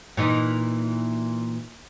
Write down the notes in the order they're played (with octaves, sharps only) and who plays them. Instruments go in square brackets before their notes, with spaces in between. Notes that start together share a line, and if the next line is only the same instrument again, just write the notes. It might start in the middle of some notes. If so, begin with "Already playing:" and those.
[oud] A#2 E3 D#4